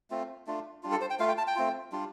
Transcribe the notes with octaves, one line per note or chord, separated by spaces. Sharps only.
A3 C4 F4
A3 D4 F4
G3 D4 F4
A4
C5
G5
A3 F4 F5
G5
A5
G5
A3 C4 F4
G3 D4 F4